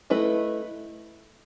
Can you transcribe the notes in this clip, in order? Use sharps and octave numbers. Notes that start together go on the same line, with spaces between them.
A3 E4 B4 D#5